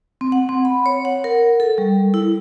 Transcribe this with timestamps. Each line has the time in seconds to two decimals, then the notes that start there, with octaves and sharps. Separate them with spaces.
0.21 C4
0.32 F#5
0.49 C4
0.65 B5
0.86 C#5
1.05 F#5
1.24 A#4
1.60 A4
1.78 G3
2.14 E4